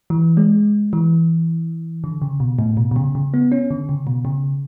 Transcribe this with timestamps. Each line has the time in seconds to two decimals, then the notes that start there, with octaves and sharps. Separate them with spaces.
0.10 E3
0.37 G#3
0.93 E3
2.04 D3
2.22 C#3
2.40 B2
2.59 A2
2.77 B2
2.91 B2
2.96 C#3
3.15 C#3
3.34 B3
3.52 C#4
3.71 D3
3.89 C#3
4.07 B2
4.25 C#3